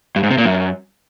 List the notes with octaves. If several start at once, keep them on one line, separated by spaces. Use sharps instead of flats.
G2
G#2
C3
A#2
F#2